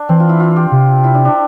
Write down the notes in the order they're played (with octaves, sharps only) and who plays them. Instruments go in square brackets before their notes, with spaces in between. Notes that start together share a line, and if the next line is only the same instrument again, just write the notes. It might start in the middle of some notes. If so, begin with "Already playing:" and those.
Already playing: [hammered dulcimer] D4
[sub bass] E3 [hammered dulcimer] C4
[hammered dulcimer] F4
E4
F4
G4
[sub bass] C3
[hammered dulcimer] E4
D4
D4